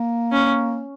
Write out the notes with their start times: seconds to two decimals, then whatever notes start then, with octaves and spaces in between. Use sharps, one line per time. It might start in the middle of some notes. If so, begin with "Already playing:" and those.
Already playing: A#3
0.32 C#4